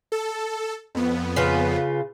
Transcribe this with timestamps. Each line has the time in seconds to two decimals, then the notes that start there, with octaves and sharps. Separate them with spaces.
0.12 A4
0.95 F2 B3
1.36 C#3 F4 B4